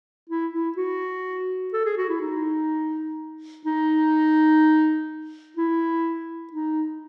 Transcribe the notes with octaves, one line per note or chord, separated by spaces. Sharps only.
E4
E4
F#4
A4
G#4
F#4
E4
D#4
D#4
E4
D#4